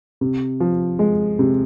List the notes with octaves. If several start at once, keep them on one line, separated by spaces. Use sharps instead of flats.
C3
F3
G#3
C3